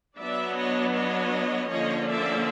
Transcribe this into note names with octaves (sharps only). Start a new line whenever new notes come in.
F#3 B3 D4 D5 E5
C#5 D#5
C#5 D#5
D3 F3 A#3 C#4 C#5 D#5
D5 E5